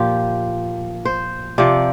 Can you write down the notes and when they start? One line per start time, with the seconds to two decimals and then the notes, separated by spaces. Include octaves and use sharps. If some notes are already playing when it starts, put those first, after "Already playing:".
Already playing: A#2 F3 F4 G4
1.05 C5
1.58 C3 F3 D5